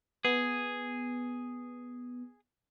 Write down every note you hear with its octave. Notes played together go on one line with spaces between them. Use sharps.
B3 G#4